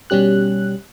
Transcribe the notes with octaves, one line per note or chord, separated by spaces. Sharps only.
B2 G3 C#4 G4 F#6